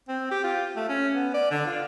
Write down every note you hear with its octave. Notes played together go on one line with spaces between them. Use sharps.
C4
G4
F4
A3
C#4
B3
D5
D3
F4